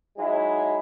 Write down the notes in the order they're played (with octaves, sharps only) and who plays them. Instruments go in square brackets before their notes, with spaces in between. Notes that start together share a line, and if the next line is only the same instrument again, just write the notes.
[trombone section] F#3 G#3 D#4 E4